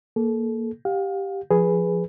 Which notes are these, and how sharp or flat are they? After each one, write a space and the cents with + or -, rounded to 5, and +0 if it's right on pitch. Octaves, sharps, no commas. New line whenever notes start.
A#3 +0 A4 -30
G4 +0 F5 +30
F3 +0 G#4 +0 B4 +0